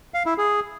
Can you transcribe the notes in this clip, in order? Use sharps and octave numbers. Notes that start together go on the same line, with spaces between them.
F5
E4
G#4